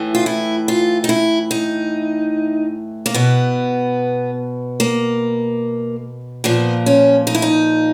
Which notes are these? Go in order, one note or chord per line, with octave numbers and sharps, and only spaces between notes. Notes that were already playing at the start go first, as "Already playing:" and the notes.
Already playing: A2 E3
F4
E4
F4
D#4
E4
D#4
A#3
B2 B3
A#3
A#2 F3 B3
C#4
D#4
E4
D#4